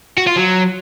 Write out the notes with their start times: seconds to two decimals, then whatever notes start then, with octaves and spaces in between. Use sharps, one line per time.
0.18 F#4
0.27 F4
0.36 F#3